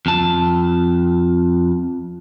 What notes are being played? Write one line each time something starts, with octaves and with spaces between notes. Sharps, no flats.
F2 A5